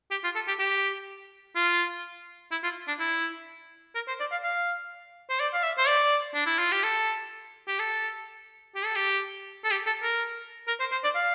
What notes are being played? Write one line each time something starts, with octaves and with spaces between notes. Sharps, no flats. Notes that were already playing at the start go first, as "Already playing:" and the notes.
G4
F4
A4
G4
G4
F4
E4
F4
D4
E4
A#4
C5
D5
F5
F5
C5
D5
F5
E5
C5
D5
D4
E4
F4
G4
A4
G4
A4
G4
A4
G4
A4
G4
A4
A#4
A#4
C5
C5
D5
F5